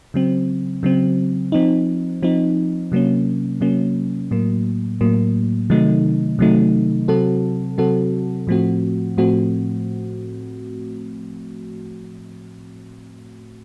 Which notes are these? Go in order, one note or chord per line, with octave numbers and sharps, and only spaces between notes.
C#3 F#3 C4
C#3 F#3 C4
F3 C4 D#4
F3 C4 D#4
C3 F#3 A#3 C#4
C3 F#3 A#3 C#4
A2 F#3 A#3
A2 F#3 A#3
C3 D#3 F#3 A3 D#4
C3 D#3 F#3 A3 D#4
C3 F#3 C4 F#4 A4
C3 F#3 C4 F#4 A4
A2 F3 A3 C4 F#4
A2 F3 A3 C4 F#4